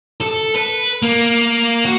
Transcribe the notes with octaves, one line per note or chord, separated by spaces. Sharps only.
A4
B4
A#3
F#4